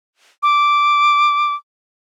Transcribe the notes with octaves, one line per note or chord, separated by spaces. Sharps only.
D6